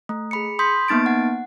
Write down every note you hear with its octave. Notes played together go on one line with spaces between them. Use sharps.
A3
G#4 B5 C#7
B5 C6 D#6 G6 B6
A#3 B3 D#4 A6 D7
F#5